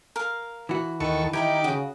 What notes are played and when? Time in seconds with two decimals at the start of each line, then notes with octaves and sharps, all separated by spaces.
0.16 A#4 F5
0.69 E3 F#4
1.00 D#2 D#3 A4 B4 C#6
1.33 D#3 D#4 E4 G4 A#5 D6
1.64 C#3 F#4 D#6